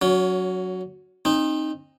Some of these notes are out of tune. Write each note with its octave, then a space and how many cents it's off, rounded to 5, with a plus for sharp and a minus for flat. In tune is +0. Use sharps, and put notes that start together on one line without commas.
F#3 -5 C#4 +25
C4 +35 D#4 -5